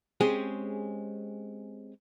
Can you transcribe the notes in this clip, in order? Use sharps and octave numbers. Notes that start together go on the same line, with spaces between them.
G#3 C4 C#4 G4 G#4